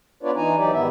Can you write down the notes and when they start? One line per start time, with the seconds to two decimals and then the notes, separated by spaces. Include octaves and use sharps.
0.23 B3 D4 F4 B4 C#5 D5
0.36 E3 D#4 G#5 A#5
0.57 E3 F#3 D#4 G4 D5
0.72 G#2 D#3 B3 E4 E5